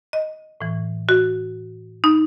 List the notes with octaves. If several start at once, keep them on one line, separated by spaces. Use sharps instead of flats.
D#5
A2 E3
F#4
D#4